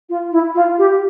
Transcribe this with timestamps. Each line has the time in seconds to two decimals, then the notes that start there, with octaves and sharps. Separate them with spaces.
0.09 F4
0.31 E4
0.54 F4
0.78 G4